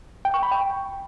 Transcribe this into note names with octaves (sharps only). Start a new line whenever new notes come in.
G5
C#6
B5
G5